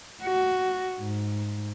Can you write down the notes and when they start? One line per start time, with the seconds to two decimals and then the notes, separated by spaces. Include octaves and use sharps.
0.22 F#4
1.00 G#2